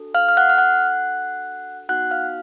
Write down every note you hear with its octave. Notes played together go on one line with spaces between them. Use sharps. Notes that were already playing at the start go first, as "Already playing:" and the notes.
Already playing: D4 F#4 A4
F5 F6
F6
F#5 F#6
F6
F#5 F#6
B3 D#4 F#4 F#5 F#6
F5 F6